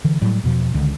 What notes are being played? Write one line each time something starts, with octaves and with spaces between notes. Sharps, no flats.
D3 E3
A2 F#3 G3
E2 B2 F3
C#2 D3 D#3